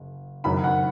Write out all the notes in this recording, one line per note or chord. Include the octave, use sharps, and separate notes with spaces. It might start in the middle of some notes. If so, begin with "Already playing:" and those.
Already playing: F#1
F#1 F#2 D#3 F#3 B5
F#5